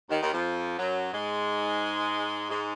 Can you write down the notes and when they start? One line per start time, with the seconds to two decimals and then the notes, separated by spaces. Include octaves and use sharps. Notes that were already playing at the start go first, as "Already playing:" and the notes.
0.10 D#2 D#3
0.21 D#2 D#3
0.33 F2 F3
0.78 F#2 F#3
1.13 G#2 G#3
2.49 G#2 G#3